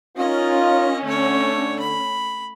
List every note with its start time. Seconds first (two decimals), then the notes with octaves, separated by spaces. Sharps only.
0.17 C#4 D#4 F4 A#4 D#5
1.04 D3 A3 C#5
1.80 B5